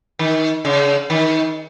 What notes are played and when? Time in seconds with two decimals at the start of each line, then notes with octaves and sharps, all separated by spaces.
0.19 D#3
0.65 C#3
1.10 D#3